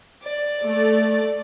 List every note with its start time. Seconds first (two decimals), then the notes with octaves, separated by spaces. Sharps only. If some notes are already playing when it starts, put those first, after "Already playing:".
0.23 D5
0.62 A3